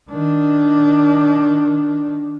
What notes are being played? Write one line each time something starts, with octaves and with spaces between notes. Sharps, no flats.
D#3 D4